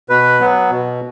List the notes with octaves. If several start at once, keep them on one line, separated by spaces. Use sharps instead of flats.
B2 B4
F#3 B3
B2